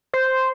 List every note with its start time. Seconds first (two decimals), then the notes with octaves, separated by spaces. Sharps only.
0.14 C5